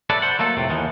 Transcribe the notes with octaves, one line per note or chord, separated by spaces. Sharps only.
A4 B4 C#5 D5 E5
C5 F#5
F#3 A3 A#3 A4
F2 A2 C3
D#2 E3 F3 B3